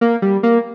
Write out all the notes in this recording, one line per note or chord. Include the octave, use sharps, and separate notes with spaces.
A#3
G3
A#3